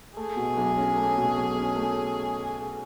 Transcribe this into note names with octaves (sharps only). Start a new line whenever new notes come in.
A3 G#4
B2
B1
C#4
A3
B2
B1
C#4
A3